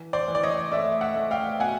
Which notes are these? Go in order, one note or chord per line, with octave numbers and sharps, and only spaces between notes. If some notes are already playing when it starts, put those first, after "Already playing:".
Already playing: E3
C5 D5
E3
D5
C#5 D#5
A3 D5 E5
E5 F#5
A3
F5 G5
B2 F#5 G#5